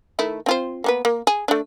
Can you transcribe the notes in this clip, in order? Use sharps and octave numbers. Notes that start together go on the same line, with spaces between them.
D#3 A3 E4
C4 F4 C5
A#3 B3 B4
A#3
G#4
A3 D4